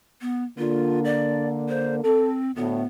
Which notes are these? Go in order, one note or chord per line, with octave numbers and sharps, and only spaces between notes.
B3
D3 A#3 F4
D5
C5
C4 A4
D2 A2 B3